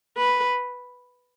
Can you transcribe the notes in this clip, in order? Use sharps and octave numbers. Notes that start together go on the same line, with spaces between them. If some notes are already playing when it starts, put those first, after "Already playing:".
B4